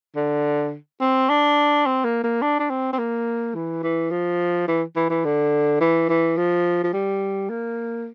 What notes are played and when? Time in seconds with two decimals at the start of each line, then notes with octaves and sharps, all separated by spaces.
0.16 D3
1.01 C4
1.29 D4
1.86 C4
2.04 A#3
2.24 A#3
2.42 D4
2.60 D4
2.70 C4
2.93 C4
2.99 A#3
3.55 E3
3.83 E3
4.11 F3
4.68 E3
4.96 E3
5.10 E3
5.25 D3
5.81 E3
6.09 E3
6.37 F3
6.83 F3
6.93 G3
7.50 A#3